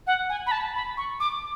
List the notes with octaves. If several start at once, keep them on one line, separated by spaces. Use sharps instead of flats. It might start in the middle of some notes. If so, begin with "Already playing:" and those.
F#5
G#5
B5
A5
B5
C#6
D6